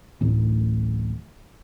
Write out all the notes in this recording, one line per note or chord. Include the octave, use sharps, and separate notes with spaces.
D1 A1